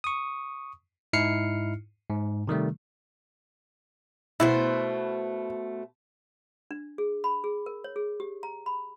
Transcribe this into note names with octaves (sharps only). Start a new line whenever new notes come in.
C#6 D#6
G#2 D#4 E4 F6 C7 C#7
G#2
C3 D#3 G3 A3
B2 A3 E4 C5
D4
G#4
B5
G#4
A#4
C#5
G#4
G4
A#5
B5